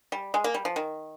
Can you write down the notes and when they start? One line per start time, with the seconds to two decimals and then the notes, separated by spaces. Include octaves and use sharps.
0.12 G3
0.34 G#3
0.44 A#3
0.54 G3
0.65 F3
0.76 D#3